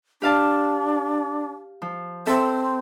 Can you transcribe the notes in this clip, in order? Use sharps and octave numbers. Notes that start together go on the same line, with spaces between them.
D4 G4 F5 A5
F3
C4 A4 E5